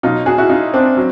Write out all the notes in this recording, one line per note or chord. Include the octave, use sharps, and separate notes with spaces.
B2 F#3 D#4 F4
F#4 G#4
E4 F#4
D#4 F4
C4 D4
F#3